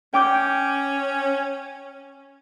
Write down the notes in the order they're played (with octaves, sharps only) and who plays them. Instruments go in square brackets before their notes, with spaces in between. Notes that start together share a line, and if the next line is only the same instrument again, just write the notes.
[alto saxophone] C#4 [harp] G5 D6 G6